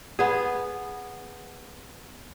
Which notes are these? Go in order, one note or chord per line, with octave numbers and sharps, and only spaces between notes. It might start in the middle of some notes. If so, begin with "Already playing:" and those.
B3 G#4